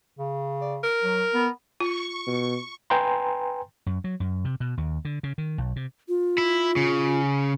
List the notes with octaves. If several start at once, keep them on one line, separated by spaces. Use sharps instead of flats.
C#3
D5
A#4
F#3
B3
F4 C#6
B2
B4 G5 G#5 A#5 C6
F#2
F#3
F#2
C3
B2
D#2
D3
C#3
D#3
B1
C3
F4
E4
C#3